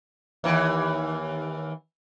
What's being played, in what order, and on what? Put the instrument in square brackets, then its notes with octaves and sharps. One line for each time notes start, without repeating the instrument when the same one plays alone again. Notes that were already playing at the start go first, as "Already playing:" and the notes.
[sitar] D#2 E3